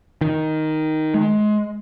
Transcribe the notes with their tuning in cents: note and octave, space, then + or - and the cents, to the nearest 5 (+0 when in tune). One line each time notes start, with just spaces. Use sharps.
D#3 +5
G#3 +25